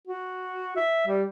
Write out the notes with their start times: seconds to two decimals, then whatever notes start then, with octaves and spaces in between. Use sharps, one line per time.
0.07 F#4
0.76 E5
1.07 G3